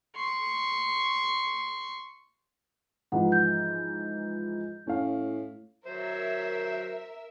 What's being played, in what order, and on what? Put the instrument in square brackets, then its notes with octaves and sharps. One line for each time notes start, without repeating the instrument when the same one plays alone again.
[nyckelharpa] C6 C#6
[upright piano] G#2 E3 F3 [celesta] F#5
[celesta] G6
[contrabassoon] A2 [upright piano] C#4 F5
[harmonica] F#3 C5 [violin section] A#4 E5